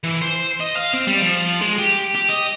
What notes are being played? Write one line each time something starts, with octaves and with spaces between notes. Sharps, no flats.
E3
C5
D#5
F5
C4
G3
F3
G#3
G4
G4
D#5